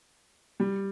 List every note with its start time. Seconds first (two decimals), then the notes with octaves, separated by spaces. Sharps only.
0.60 G3